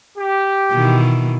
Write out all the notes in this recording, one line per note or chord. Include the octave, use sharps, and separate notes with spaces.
G4
B2 D#3 E3